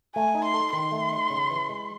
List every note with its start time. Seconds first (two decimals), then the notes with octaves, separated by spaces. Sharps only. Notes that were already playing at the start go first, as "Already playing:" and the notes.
0.15 A3 G#5
0.35 D#4
0.45 C6
0.54 A4
0.73 D#3 C6
0.92 A3
1.12 D#4
1.30 C#3
1.50 E3
1.69 G#3